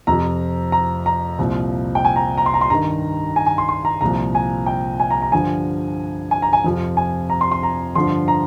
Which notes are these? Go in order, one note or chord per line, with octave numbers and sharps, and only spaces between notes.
F2 C3 F3 A#5
A#5
A#5
C2 A#2 F3
G5
G#5
A#5
A#5
C6
A#5
C6
G2 D#3 A#5
G#5
G#5
C6
C6
A#5
C2 A#2 F3 A#5
G#5
G5
G#5
A#5
A#5
G2 D3 F3 G#5
G#5
A#5
G#5
F2 C3 F3
G#5
A#5
C6
C6
A#5
G2 D3 F3 C6
A#5